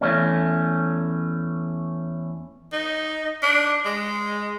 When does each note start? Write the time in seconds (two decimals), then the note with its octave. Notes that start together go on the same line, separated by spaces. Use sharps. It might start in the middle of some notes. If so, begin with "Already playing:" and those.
0.01 E2 A3 C#4
2.72 D#4
3.43 D4
3.85 G#3